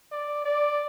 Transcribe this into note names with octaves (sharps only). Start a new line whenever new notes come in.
D5
D5